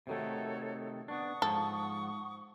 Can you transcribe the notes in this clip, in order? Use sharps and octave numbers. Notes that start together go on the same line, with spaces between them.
C3 D#3 A3 F#4 A4 C#5
B3 D4 F#5 C#6 D#6
G#2 F3 A4